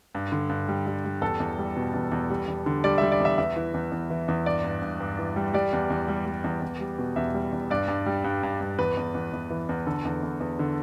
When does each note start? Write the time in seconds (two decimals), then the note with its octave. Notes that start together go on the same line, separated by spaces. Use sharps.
0.15 G2
0.32 D3
0.49 G2
0.68 G3
0.87 G3
1.05 G3
1.21 E2 A4
1.40 E2
1.59 G3
1.77 B2
1.94 E2
2.12 E2
2.30 G3
2.48 E2
2.66 D3
2.84 G3 D5
2.98 G3 E5
3.12 D5
3.20 E2 E5
3.38 E2 E5
3.56 E3
3.74 E2
3.92 E2
4.10 E3
4.28 E2
4.46 G2 D5
4.64 G2
4.82 G2
5.00 G2
5.19 E3
5.36 G3
5.54 G3 D5
5.73 E2
5.90 E2
6.08 G3
6.26 G3
6.44 E2
6.62 E2
6.81 G3
6.98 B2
7.16 E2 E5
7.34 G3
7.52 E2
7.70 G2 D5
7.88 G2
8.06 G3
8.24 G2
8.43 G2
8.61 G2
8.78 E2 B4
8.97 E2
9.15 E2
9.33 E2
9.50 E3
9.69 E2
9.87 D3 A4
10.05 E2
10.23 E2
10.40 E2
10.59 D3